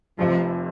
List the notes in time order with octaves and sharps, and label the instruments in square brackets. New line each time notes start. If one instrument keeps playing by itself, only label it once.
[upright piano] F1 F2 C3 [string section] F3